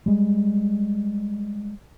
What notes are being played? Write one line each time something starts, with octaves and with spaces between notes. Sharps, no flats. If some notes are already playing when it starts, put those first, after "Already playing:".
G3 G#3